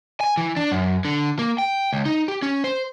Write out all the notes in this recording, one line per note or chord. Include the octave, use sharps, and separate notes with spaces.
G#5
E3
D4
F#2
D3
A#3
G5
C#2
D#4
G4
C#4
C5